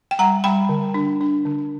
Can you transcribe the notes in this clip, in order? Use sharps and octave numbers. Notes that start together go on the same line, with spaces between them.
G5
G3 F#5 A#5
G3 G5 B5
D3
D4
D4
D3